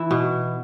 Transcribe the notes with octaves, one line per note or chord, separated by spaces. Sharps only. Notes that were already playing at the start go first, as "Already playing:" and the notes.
Already playing: E3 E4
B2